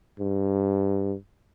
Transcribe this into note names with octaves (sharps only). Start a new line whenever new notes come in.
G2